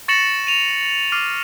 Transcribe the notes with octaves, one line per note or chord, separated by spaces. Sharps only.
C#6 A6 A#6 C#7 E7 F#7
D#7 F7
D6 F6 C7 D#7